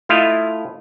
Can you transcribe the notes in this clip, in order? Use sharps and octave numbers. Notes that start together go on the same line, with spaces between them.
A3 E4 F4 D#5 F5